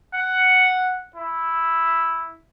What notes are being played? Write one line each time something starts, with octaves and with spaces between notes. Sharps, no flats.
F#5
E4